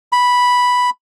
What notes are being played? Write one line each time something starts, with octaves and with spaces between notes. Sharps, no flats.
B5